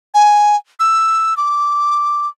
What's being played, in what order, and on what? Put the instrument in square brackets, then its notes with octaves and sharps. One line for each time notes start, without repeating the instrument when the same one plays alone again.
[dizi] G#5
E6
D6